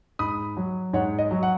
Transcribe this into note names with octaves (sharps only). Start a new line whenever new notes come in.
G#2 B5 D#6
F#3
G#2 C#5 F#5
D#5
F#3
F#5